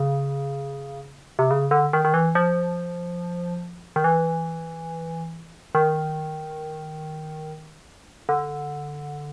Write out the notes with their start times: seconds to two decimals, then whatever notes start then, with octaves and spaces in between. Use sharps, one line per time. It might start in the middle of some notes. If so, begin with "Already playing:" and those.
Already playing: C#3
1.39 C3
1.51 C#3
1.71 D3
1.93 D#3
2.05 D#3
2.14 E3
2.35 F3
3.96 D#3
4.04 E3
5.75 D#3
8.29 D3